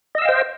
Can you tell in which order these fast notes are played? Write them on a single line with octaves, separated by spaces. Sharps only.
D#5 E6 F5 G5 C5